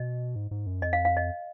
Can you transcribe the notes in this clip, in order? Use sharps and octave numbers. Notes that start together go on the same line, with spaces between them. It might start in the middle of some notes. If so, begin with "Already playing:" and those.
Already playing: B2 D#5
G#2
G#2
F#2
F2 D#5
F5
F5
D#5